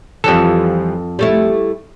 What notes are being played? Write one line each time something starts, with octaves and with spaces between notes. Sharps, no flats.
F2 E3 F3 G3 A4
G3 A3 E4